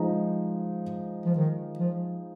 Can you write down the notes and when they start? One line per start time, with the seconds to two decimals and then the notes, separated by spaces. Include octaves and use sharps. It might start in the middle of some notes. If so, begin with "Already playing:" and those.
Already playing: F3 G#3 D#4
1.26 F3
1.35 D#3
1.79 F3